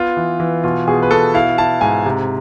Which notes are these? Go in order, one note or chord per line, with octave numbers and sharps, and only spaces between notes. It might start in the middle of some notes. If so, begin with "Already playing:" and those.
Already playing: B3 F4
E3
E3
B2 F4
B2 G#4
B4
B2 A4
E4 F5
E4 A5
G#2 G#5
C3